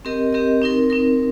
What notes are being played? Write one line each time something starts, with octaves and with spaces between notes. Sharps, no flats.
C4 G4 A#4 D#5
C4 G4 A#4 D#5
C4 D#4 A#4
C4 D#4 A#4